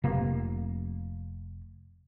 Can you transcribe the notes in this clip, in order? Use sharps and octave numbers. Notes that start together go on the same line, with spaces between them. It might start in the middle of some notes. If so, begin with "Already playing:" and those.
F1 C3 A#3